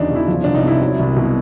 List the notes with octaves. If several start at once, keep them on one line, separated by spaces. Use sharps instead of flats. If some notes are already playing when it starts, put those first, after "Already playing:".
Already playing: E2 C#3 F#3 D4 D#4
B2
E4
F3
C2 D4
D#4
C3 E4
F#3
C2
B2